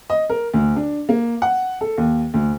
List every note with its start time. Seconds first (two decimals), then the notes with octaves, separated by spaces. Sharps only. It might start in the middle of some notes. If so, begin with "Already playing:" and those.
0.10 D#5
0.30 A#4
0.54 D2
0.76 D4
1.09 A#3
1.42 F#5
1.81 A4
1.98 D#2
2.34 D2